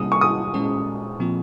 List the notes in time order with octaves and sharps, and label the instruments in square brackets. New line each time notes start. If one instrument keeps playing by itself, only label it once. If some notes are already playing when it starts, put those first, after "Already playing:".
Already playing: [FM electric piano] C3 G3 A#3 C#4 G4 [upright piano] D#6
[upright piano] C#6
D#6
[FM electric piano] A#2 G#3 C#4 G#4 C5
A#2 F3 C4 F4